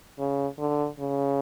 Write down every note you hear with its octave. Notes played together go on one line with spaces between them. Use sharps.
C#3
D3
C#3